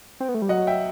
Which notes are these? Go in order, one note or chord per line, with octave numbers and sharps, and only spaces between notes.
C4
B3
A3
G3
F#3 D#5 F#5
E5 G5